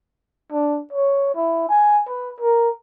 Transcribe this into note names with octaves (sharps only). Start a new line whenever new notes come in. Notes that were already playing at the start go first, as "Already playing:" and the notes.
D4
C#5
E4
G#5
B4
A#4